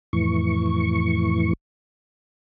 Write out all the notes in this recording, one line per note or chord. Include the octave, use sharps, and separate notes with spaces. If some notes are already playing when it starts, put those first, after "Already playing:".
F2 A2 E3 C#6